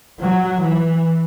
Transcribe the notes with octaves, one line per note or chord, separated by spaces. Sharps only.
F#3
E3